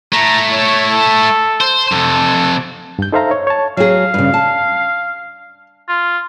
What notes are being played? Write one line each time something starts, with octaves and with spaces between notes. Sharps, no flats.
A3 E4 A#5
C#5
A4
C5
F2 C3 A4
G2 G6
D#4 A4 C5 E5 F5 A#5
C#5
C#5 A5
F#3 G#4 F5
G2 C#3
A5
F4